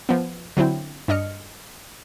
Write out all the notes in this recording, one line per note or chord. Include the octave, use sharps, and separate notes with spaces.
F3 B3
D3 F#3 C4 E4 G5
G2 D4 D#5 F6 C#7